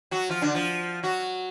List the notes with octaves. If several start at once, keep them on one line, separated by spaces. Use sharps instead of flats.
F#3 F#4
F3 F4
D3 D4
F3 F4
F#3 F#4